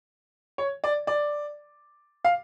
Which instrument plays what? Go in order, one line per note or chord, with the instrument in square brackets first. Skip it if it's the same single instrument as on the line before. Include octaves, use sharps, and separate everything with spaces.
[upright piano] C#5
D5
D5
F5